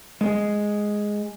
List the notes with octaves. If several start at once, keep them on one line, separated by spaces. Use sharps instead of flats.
G#3